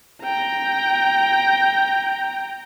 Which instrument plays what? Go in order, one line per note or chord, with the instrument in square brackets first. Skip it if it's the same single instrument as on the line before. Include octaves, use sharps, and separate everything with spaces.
[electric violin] G5 A#5